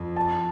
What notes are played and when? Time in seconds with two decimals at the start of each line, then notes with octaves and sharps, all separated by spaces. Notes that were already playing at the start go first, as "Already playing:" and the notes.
Already playing: F2
0.16 A5